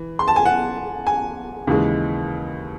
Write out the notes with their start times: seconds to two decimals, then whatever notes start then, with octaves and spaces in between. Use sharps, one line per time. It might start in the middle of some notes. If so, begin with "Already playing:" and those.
Already playing: E3
0.19 C6
0.28 A5
0.36 G#5
0.45 F#5
1.07 G#5
1.67 D#2 C#3 E3 G#3